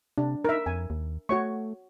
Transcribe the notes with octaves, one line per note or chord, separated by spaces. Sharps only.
C3 D4
D#4 A#4 E5
F2 G#5
D#2
A3 F#4 C#5 C#6